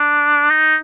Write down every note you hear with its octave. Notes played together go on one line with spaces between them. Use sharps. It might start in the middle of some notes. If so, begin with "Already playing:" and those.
Already playing: D4
D#4